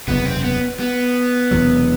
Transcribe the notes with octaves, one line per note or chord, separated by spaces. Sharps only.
F#1 E2 C3 B3
C4
B3
B3
E1 E2 C3 F#3